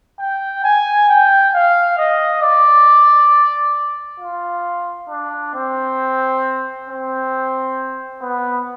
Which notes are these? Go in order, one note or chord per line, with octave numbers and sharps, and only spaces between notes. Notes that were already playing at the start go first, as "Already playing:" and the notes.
G5
G#5
G5
F5
D#5
D5
F4
D4
C4
C4
B3